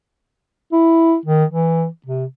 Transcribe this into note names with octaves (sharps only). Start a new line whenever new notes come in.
E4
D#3
E3
C3